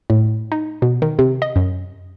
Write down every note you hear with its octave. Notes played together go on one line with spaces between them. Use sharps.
A2
D#4
B2
D#3
C3
D#5
F#2